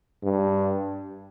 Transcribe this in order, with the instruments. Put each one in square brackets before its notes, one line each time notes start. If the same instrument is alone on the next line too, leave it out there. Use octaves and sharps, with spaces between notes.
[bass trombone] G2